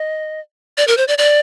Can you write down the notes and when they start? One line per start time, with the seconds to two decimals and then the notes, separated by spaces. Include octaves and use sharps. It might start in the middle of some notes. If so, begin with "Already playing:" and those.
Already playing: D#5
0.77 D5
0.88 A#4
0.97 C5
1.08 D5
1.18 D5